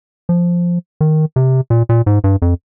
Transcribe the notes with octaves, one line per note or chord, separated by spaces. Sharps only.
F3
D#3
C3
A#2
A#2
G#2
G2
F2